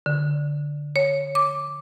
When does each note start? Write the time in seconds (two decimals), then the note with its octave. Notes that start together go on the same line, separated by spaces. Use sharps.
0.06 D3
0.96 C#5
1.35 D6